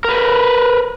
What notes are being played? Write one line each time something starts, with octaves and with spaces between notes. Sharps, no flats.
A#4 B4